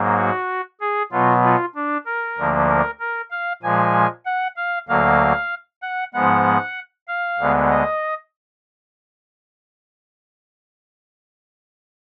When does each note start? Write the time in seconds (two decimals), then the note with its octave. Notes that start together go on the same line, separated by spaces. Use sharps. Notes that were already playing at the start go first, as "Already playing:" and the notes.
Already playing: G#2 F#3 A#3
0.17 F#4
0.81 G#4
1.12 B2 F#3 B3 F4
1.44 F4
1.75 D4
2.06 A#4
2.38 D2 D3 F3 A#3
2.69 A#4
3.00 A#4
3.31 F5
3.63 A#2 F3 G#3 G#5
4.26 F#5
4.56 F5
4.88 D2 D3 F#3 A#3 F5
5.82 F#5
6.14 G#2 F3 G#3 B3 F#5
7.08 F5
7.39 D2 D3 G#3 B3
7.70 D#5